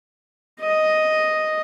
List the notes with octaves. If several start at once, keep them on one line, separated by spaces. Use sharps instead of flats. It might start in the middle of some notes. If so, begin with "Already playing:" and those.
D#5